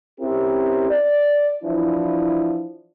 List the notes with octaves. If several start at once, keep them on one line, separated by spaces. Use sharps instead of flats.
C4 C#4 E4 G4 A#4
D5
E3 F3 D4 E4